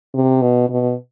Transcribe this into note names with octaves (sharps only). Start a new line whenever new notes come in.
C3
B2
B2